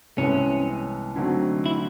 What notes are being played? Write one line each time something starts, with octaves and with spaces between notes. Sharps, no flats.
C2 C3 E3 G#3 B3 C#4
D3 F#3 A3 C4 D#4
E4